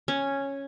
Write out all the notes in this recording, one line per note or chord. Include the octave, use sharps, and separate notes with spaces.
C#4